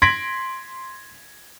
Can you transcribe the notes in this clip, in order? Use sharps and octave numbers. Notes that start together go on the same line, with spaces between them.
C6 G#6 A#6 B6 D7 F#7